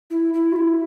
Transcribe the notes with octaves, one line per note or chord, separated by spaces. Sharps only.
E4
E4
F#4
E4